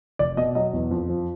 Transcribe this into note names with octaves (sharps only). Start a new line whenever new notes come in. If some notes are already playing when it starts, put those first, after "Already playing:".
F1 D5
B2 D#5
F#3 D#5
E2
F2
F3